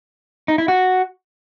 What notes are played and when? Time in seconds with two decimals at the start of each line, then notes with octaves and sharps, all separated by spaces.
0.48 D#4
0.58 E4
0.68 F#4